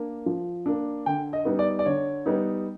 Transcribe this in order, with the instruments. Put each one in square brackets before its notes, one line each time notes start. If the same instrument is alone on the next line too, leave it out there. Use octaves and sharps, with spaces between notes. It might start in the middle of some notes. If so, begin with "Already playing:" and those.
Already playing: [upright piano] A#3 D4
F3
A#3 D4
D3 G5
D#5
G3 B3 D#4
D5
D5
D3 C#5
G3 B3 D#4